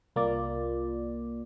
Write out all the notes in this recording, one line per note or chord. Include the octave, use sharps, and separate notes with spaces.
C2 A#3 F4 D5